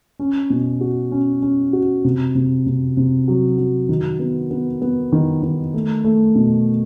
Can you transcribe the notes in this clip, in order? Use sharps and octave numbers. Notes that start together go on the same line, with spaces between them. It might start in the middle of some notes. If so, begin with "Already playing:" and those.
C#4
B2
F#4
C#4
C#4
F#4
C3
C3
C3
C3
F#3
F#3
D#3
B3
B3
B3
D#3
D#3
A3
A3
B2